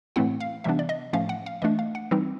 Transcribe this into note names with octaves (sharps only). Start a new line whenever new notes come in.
A2 E3 A3 C4 E4 F#5
F5
C3 E3 G3 B3 D4 E5
D5
D#5
A2 F3 A3 C#4 F5
F#5
F5
E3 A3 D4 D#5
F5
F#5
E3 G3 C4 D#4